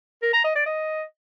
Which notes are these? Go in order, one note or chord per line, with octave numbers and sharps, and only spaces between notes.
A#4
A#5
D#5
D5
D#5